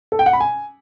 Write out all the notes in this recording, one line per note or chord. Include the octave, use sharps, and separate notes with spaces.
A4
G5
F#5
B5
G#5